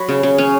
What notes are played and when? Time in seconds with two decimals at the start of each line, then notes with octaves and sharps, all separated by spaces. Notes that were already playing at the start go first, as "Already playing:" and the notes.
Already playing: F#3 B5 C#6
0.09 C#3
0.23 C#3
0.38 C#4